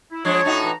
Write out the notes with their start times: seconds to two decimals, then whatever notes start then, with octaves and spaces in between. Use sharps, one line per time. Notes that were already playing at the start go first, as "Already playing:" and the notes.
0.12 E4
0.25 F3 G#3 D4 C#5
0.45 A2 D#4 F#4
0.64 E3 A#5